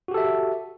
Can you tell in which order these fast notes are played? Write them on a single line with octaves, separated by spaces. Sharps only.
F#4 G4 A4 E5